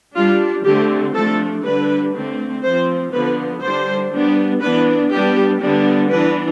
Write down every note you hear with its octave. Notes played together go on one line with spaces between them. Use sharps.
G3 D4 F4
D3 A3 C4 G4
F3 A3 D4 A4
D3 G3 D4 B4
D3 A3 C4
F3 C4 C5
D3 F3 B3 B4
D3 G3 D4 C5
G3 B3 D4
E3 B3 D4 B4
G3 B3 D4 G4
D3 G3 B3 D4
E3 B3 D4 B4